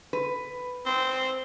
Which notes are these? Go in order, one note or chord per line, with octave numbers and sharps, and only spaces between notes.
B4
C4